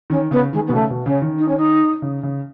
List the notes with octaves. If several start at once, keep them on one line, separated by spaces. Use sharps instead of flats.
D#3 C#4
C#3 B3
D#3 G#3
B3
B2
C#3 A3
B2
C#3 C#4
D#3
D#4
C#4
D#4
C#3
C#3